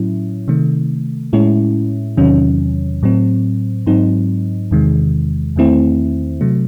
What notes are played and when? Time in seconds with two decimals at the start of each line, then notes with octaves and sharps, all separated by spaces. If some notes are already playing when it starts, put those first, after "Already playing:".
Already playing: A2 F#3 C#4 E4
0.48 C3 D#3 A3
1.33 A2 G#3 C#4 E4
2.17 E2 C3 D#3 F#3 C#4
3.03 A2 F#3 C4
3.87 G#2 F#3 C4 D#4
4.71 E2 C3 D#3 G#3
5.56 E2 D#3 A3 C4 E4
6.41 C3 F#3 A3